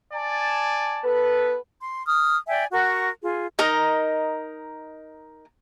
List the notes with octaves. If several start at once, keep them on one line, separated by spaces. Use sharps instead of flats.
D5 G#5 A5
B3 A4 B4
C6
D#6 F6
D5 E5 G5 G#5
F#4 A#4 F#5 C#6
F4 G#4
D#4 A#4 D#5